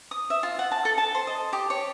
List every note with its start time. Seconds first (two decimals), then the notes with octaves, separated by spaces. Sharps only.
0.11 D#6
0.30 E5
0.43 F4
0.59 F#5
0.71 A5
0.85 A4
0.98 A5
1.15 C5
1.27 D#5
1.53 G4
1.70 C#5